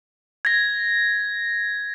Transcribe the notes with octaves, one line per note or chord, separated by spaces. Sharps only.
G#6 A#6